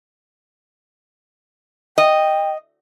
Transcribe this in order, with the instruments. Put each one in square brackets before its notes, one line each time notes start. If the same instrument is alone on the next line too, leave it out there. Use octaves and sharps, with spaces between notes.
[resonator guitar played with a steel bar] D#5 [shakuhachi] G5